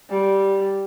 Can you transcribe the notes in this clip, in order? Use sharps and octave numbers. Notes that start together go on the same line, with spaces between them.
G3